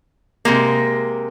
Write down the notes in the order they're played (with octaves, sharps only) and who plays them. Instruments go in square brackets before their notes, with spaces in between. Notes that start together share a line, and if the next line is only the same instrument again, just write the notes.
[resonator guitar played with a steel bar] C3 G#3 A#3